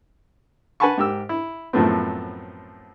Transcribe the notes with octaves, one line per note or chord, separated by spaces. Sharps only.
B4 F#5 G#5 A5 B5 C#6
G#2 G4 A#4 E6
E4
F#2 A2 F3 A3 B3 C4